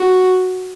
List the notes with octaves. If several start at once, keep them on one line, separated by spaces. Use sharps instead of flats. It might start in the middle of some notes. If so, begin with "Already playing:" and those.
Already playing: F#4